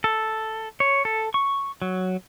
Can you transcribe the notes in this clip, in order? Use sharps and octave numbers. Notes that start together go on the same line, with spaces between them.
A4
C#5
A4
C#6
F#3